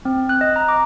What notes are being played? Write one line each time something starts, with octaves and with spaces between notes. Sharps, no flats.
C4
F#6
D#5
A#5
D6